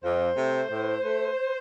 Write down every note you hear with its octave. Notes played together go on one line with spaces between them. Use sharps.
F2 C5
C3 A3
A2
A3